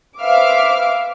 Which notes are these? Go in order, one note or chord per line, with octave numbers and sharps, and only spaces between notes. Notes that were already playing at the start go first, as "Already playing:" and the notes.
B4 C5 E5 F5 D6 F6